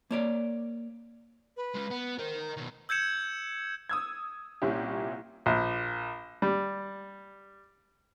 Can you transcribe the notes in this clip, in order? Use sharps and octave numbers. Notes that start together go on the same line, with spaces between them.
A#3 C#5 D5
B4
G#3 C#4
B3
A#4 C5 D#5
A#5
B2 D#3
E6 G6 G#6 C#7 E7
D#6 E6 G#6
C2 A#2 C#4 E4 G4
A#1
G3